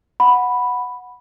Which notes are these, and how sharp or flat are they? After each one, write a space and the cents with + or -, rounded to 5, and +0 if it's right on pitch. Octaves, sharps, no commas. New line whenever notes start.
F#5 -10 B5 +0